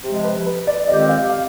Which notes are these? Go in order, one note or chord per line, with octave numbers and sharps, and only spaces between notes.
C3 F3 G#3
B4
B4
D5
F2 D#3 G#3 C4 G4 D#5
F5
F5